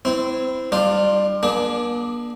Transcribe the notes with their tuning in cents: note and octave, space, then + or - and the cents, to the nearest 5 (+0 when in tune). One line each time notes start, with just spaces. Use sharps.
C4 -20 E4 +0
G3 +0 D4 +30 F4 +0
A#3 +40 D4 +0 G#4 +30